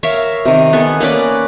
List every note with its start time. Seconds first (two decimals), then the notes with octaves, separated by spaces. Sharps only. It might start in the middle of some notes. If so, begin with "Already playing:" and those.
0.03 A#4 C#5 E5 F5
0.45 C3 D#3
0.73 B3 A4 G#5
1.00 A#3 C#4 B4 D5